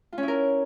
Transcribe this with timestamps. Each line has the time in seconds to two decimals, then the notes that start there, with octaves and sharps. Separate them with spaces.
0.12 F4
0.18 C#4
0.23 E4
0.28 A#4